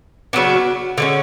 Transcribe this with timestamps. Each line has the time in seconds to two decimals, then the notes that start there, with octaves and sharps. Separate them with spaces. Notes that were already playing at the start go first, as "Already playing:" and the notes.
0.33 C#3 F#3 B3 D4
0.98 D3 G#3 C#4